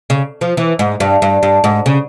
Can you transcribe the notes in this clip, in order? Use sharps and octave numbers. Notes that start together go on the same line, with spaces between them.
C#3
F3
E3
G#2
G2
G2
G2
G#2
C#3